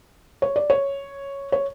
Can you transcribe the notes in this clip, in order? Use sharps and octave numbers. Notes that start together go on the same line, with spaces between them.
C#5
D5
C#5
C#5